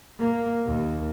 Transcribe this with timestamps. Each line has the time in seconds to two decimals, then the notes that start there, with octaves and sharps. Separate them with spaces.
0.19 A#3
0.65 D#2